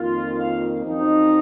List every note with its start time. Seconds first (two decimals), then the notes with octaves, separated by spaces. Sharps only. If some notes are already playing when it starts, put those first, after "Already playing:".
Already playing: F2 D#3 A#3 F4
0.38 F4 F5
0.84 F#2 F3 C4 D#4